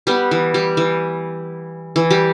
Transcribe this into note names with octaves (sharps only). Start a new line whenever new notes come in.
G3 B3
E3
G3
E3
E3
G3